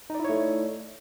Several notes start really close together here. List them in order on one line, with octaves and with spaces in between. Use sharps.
D#4 D5 E4 C#5 A3